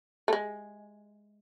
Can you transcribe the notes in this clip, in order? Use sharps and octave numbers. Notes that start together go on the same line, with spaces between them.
A3
G#3